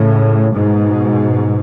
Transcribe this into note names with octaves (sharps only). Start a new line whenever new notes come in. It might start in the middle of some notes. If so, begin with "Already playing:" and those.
Already playing: A2 C#3
G#2 B2